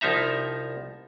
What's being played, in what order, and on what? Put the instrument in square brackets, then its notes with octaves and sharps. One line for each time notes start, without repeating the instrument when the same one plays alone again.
[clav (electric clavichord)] C2 F3 D#4 E5 A#5